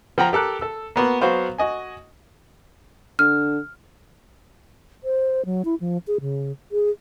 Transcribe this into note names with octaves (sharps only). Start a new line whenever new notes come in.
F3 F#5 G5 A#5
G4 A4 A#4 F#6
A4 E6
A#3 B3 F#4
F#3 B3 F#4 C5 F5
F#4 D#5 G#5
D3 F6
C5
F#3
E4
F3
G#4
C#3
G#4